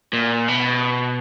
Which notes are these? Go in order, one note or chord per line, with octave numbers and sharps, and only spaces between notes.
A#2
B2